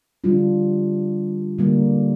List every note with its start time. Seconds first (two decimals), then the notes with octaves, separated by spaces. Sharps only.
0.24 D3 G3 D4 F4
1.59 D3 G3 A#3